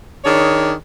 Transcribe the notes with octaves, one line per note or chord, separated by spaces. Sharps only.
D#3 D4 G#4 C#5